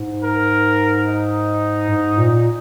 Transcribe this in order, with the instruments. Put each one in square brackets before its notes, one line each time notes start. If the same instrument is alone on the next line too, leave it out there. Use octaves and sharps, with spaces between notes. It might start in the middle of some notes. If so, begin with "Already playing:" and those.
Already playing: [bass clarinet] G#2
[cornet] A#4
D#4
[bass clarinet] G#2
A#2